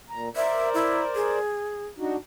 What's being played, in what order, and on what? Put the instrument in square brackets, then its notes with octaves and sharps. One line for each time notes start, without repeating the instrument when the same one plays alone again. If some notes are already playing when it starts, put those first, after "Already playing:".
[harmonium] A#2 A#5
[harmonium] A#4 C5 D5 [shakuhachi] E5
[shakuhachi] E4
G#4
[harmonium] D4 D#4 F#4